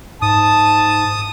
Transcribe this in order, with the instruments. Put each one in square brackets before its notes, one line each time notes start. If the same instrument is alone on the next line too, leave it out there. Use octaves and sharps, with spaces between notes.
[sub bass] G#2 [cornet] A5 [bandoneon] D#6